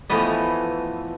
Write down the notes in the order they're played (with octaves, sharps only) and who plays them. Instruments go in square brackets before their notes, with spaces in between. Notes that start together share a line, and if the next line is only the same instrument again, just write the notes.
[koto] E3 F3 A3 B3 D#5